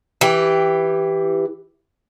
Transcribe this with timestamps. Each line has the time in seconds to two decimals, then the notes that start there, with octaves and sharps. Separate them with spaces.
0.21 E3 G4